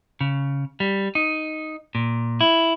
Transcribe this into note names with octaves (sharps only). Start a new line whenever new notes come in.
C#3
G3
D#4
A#2
E4